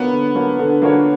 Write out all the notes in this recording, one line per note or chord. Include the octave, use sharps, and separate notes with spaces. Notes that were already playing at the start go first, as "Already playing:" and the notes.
Already playing: D3 A#3 B3 D4 F#4 C#5
D3
A#3 D4 F#4 C#5
D3
A#3 D4 F#4 C#5